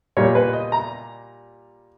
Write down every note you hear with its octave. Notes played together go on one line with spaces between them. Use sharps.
A#2 G3 C#5
B4
D#5
A#5